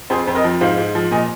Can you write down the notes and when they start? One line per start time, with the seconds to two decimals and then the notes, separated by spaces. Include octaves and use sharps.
0.10 F2 G#4 C5
0.28 F2 C5
0.35 A#4 D#5
0.44 F3
0.61 G#2 C5 F5
0.78 G#2
0.95 F3
1.11 A#2 D#5 G#5